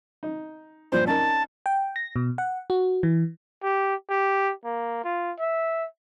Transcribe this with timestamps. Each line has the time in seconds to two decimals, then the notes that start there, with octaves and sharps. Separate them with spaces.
0.23 D#4
0.92 G2 A#2 F3 C5
1.07 C#4 D#4 A#4 A5
1.66 G5
1.96 A#6
2.16 B2
2.38 F#5
2.70 F#4
3.03 E3
3.63 G4
4.10 G4
4.65 A#3
5.05 F4
5.40 E5